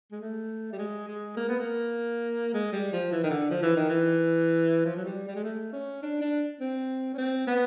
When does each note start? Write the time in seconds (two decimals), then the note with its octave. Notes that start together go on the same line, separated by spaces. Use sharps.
0.12 G#3
0.21 A3
0.72 G3
0.78 G#3
1.08 G#3
1.37 A#3
1.49 B3
1.59 A#3
2.54 G#3
2.73 G3
2.92 F3
3.11 E3
3.23 D#3
3.30 D3
3.50 F3
3.62 E3
3.76 D#3
3.89 E3
4.85 F3
4.96 F#3
5.04 G3
5.28 G3
5.35 G#3
5.44 A3
5.73 C#4
6.03 D4
6.21 D4
6.60 C4
7.14 C#4
7.18 C4
7.47 B3